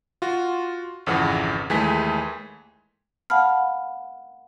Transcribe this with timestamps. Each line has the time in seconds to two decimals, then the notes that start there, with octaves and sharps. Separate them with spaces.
0.22 F4 F#4
1.06 G#1 F2 C#3 E3 F#5
1.70 D#2 E3 G#3 A3 G#5 B6
3.30 F5 F#5 A5 B5 F6